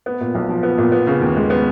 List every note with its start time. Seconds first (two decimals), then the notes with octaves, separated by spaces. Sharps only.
0.06 B3
0.21 A#2
0.34 B1
0.49 F3
0.63 B3
0.78 A#2
0.92 B3
1.07 C#3
1.22 D#2
1.36 G#3
1.50 B3